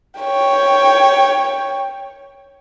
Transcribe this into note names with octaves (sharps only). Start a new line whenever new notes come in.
C#5 G5